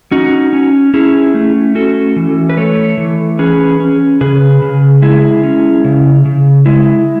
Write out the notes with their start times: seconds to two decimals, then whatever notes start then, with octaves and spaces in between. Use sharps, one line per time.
0.11 C#4 D#4 F#4
0.53 C#4
0.94 C#4 E4 G#4
1.34 A3
1.75 C#4 F#4 A4
2.16 E3
2.50 B4
2.57 A3 A4 C#5
2.98 E3
3.39 C#4 G#4 B4
3.80 C#4
4.21 C#3 G#4 B4
4.62 C#3
5.02 G#3 E4 G#4
5.44 C#4
5.85 C#3
6.25 C#3
6.66 G#3 E4